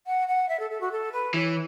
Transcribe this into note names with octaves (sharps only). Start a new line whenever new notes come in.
F#5
F#5
E5
A4
A4
F#4
A4
B4
E3 C#5